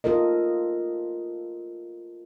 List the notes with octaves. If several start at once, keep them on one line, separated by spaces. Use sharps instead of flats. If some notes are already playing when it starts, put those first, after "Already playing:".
F4 A4 A#4 D#5